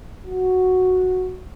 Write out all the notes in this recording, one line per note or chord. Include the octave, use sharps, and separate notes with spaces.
F#4